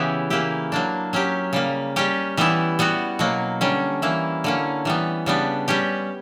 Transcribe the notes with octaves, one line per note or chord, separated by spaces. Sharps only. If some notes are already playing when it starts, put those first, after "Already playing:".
Already playing: C#3 E3 B3 C#4 E4 G4
E3 A#3 E4 G4
F#3 A#3 D4
F#3 C#4 G4
C#3 G3 A#3
G3 C#4 G4
E3 G3 B3 E4
G3 B3 F#4
B2 F#3 A#3
D3 G3 C#4
E3 A#3 E4
D3 A#3 C#4
E3 G3 B3
C#3 G3 B3 D4
G3 C#4 G4